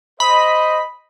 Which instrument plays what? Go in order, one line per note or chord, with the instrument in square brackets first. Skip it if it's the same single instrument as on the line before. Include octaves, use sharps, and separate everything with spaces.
[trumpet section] C5 D#5 [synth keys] B5